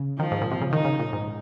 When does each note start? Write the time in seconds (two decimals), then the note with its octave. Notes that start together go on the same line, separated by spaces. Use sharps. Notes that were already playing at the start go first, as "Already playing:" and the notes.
Already playing: C#3
0.18 D#3 F3
0.32 G#2
0.42 A#2
0.51 C3
0.61 C#3
0.72 D#3 D#4
0.85 C#3
0.99 A#2
1.13 G#2